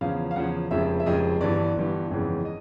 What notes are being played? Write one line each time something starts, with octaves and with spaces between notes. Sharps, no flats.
E2 C#3 F3 F5
F5
E2 C#3 F3 F#5
F1 F2 C#3 F3 G#3 E5
E5
F1 F2 C#3 F3 G#3 D#5
G1 G2 E3 D5
G1 G2 E3
G1 F2 C#3 E3 G#3
D#5